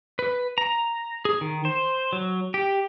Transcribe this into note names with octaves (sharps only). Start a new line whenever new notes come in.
B4
A#5
G#4
D#3
C5
F#3
G4